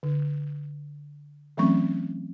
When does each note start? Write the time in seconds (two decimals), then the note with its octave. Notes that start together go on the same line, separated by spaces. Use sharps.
0.03 D3
1.57 E3 F#3 A3 C4 C#4 C#6